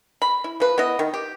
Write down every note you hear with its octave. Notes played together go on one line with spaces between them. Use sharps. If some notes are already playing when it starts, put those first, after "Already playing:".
B5
E4
F3 B4
B3 E4 D#5
D#3
G4